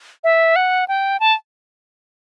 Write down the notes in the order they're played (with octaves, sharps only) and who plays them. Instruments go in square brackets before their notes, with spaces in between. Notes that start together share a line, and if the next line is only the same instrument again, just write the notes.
[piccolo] E5
F#5
G5
A5